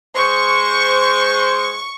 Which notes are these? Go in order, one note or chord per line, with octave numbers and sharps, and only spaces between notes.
G#3 C5 C#6